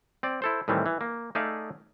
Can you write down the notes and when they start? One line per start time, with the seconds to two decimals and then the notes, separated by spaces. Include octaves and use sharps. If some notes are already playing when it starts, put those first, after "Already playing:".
0.23 C4 D5
0.42 E4 A4 C5
0.68 A2 D#3 E3 G3 C4
0.86 E3
1.01 A#3
1.35 A3 D#4 G#4 D5 E5 F5